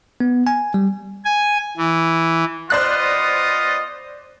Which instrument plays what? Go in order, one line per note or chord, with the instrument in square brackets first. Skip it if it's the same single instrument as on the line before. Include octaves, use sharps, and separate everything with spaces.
[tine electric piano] B3
G#5
G3
[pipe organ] G#5
E3
[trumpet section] B3 F4 D#5 [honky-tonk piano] C5 D5 F#6